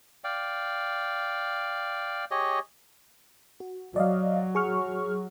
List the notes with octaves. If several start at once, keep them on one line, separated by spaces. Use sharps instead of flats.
D5 F5 G5
G4 G#4 C#5 D#5
F#4
F#3 D5 D#5 F5
G#4 C#6 F6